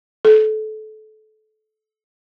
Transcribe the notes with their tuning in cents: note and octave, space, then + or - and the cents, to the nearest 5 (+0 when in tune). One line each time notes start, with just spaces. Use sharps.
A4 -25